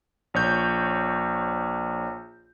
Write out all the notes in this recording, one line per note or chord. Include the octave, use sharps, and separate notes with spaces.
A#1 C#5 G6